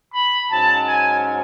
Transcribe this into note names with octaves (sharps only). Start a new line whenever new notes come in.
B5
G#2 F#3 C#4 A5
G#5